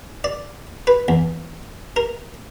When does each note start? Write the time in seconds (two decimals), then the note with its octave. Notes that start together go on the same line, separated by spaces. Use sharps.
0.24 D5
0.87 B4
1.08 E2
1.96 A#4